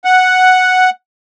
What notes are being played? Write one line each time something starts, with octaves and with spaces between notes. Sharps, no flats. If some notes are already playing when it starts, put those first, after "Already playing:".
F#5